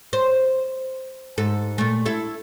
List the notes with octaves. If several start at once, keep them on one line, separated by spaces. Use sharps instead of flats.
C5
G#2 A4
A#2 A3
E4 A4